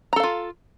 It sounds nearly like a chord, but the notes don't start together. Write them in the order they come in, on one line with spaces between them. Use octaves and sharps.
A#5 A4 F5 F4